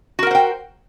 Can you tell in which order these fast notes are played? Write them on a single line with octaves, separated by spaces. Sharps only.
F#4 A#4 F#5 C5 G5